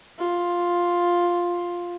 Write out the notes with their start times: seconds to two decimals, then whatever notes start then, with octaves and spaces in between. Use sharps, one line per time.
0.18 F4